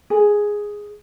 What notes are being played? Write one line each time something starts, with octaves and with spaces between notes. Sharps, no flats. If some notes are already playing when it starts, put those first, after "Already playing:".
G#4